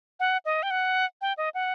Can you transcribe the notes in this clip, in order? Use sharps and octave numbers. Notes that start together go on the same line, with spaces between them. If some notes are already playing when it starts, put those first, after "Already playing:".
F#5
D#5
G5
F#5
G5
D#5
F#5